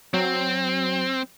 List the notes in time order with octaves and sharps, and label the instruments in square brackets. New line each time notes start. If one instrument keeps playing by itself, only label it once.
[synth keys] F#3 [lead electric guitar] C4